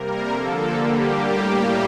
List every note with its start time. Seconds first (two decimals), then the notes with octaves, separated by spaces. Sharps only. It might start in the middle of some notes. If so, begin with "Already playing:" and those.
Already playing: C3 G3 A#3 A#4
0.29 D3 F3 A#3 A4
0.73 D3 G3 A#3 G4
1.17 A2 G3 A#3